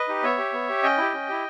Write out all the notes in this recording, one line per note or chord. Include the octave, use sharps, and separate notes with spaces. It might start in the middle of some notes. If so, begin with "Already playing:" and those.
Already playing: B4 D#5
D#4 G4
B3 C#5 E5
G4
B3
G4
C#4 D#5 G5
E4 G4
C#4
E4 G4